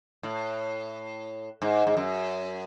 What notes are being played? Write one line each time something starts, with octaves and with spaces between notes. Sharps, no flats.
A2
G#2
G#2
F#2